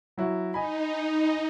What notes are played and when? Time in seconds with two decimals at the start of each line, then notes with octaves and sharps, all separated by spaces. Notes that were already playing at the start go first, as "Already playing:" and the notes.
0.18 F#3 E4 F#4
0.54 D#4 D#5 G#5 B5